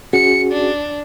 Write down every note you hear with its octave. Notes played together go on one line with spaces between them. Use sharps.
C#4 F#4 G#4 C#7
D4